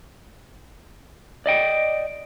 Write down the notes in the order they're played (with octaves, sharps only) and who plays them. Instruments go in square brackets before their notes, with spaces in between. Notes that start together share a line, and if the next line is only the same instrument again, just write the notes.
[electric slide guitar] D5 D#5 G5